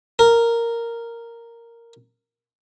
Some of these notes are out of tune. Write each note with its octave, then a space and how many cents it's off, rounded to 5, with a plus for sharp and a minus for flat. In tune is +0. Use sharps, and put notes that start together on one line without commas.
A#4 -5